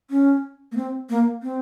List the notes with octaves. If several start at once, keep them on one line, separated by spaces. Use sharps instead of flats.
C#4
A#3
C4
A#3
C4